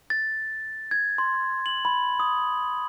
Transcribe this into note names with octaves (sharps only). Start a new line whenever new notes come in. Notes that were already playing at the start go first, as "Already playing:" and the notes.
A6
G#6
C6
F#7
B5
D#6